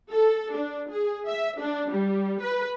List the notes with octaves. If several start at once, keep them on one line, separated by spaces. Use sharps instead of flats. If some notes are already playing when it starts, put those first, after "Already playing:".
A4
D4
G#4
E5
D4
G3
B4